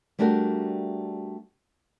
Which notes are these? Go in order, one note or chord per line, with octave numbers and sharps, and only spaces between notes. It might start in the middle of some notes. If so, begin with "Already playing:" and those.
G3 A3 D4 F#4 G4 A#4